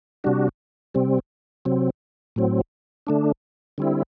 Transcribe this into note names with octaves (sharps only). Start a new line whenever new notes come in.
C3 G3 D4 F#4
C3 G3 C4
C3 F#3 C4
A2 F#3 C4
D3 A3 D4
D3 G3 C4 E4